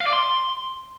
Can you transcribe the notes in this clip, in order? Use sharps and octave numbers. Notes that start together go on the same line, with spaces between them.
F5
D5
C6